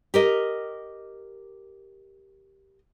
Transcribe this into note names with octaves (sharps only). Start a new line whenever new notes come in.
G4 A#4 D#5